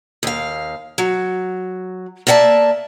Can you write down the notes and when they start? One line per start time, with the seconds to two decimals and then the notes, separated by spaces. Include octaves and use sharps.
0.23 D#2 F5
0.98 F#3
2.27 A#3 D5 E5 F#5 A5